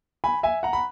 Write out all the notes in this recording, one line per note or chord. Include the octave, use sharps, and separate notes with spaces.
G#5 B5
E5 G#5
F#5 A#5
B5